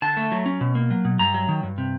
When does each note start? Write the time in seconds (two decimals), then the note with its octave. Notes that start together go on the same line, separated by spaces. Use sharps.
0.02 D3 A5
0.17 A3
0.32 F#3
0.46 C#4
0.61 B2
0.75 A#3
0.90 F#3
1.05 B2
1.19 G2 A#5
1.34 F#3
1.49 D#3
1.63 G2
1.78 C3